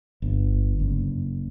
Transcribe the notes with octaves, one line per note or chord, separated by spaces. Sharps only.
G1
F#1